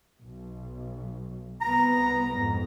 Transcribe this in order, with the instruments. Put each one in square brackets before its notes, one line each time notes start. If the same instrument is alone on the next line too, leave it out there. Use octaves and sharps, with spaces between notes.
[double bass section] B1
[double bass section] C2 B3 [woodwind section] A#5
[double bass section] F2 G#2